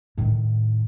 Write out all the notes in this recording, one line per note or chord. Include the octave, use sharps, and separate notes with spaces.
A2 D#3